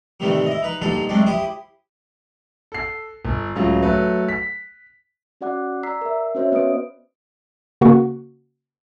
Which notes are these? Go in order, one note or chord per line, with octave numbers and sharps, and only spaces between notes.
A2 C3 D#3 E3 G3 A3
E4 D#5
D#4 B4
G2 A#2 D3 D#4 A4 C6
F#2 G#3 A3 C4 D4
E4 G4 C5 D#6
A4 C7
G1
C#2 A2 F#3 F4
F#3 A3 B4
B6
C#4 F#4 D5 F#5 D6 F#6
D5 A#5 E6 B6 C7
A#4 E5
C#4 F#4 C5 C#5 D#5 E5
B3 B4 D5 D#6 D7
C#3 A#3 F#4 C#6